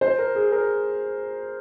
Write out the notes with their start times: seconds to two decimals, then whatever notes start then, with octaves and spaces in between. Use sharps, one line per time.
0.01 C5
0.19 A#4
0.35 G#4
0.52 A#4